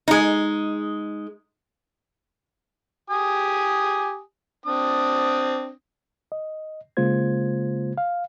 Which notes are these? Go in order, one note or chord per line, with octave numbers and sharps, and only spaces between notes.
G#3 D#4
G4 G#5 D#6
C4 D4 D#6
D#5
C#3 G#3 A#3 F4 C5 G#6
F5